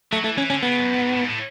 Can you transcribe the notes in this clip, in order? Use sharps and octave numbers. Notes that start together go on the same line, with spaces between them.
F#3 A3
E3 A3
E3 C#4
D3 C#4
C#3 B3
F#2
G#2
A2
G#2
A2